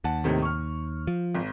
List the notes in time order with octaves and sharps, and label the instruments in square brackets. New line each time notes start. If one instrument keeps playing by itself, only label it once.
[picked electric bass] D#2 [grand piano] F#5 A5
[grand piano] A2 C3 D#3
C#6 F6
[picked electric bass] F3
[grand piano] G#1